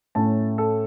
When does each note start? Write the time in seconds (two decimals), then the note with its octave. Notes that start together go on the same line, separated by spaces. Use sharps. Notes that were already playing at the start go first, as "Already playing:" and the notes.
0.15 A2 A3 C#4 A5
0.58 A4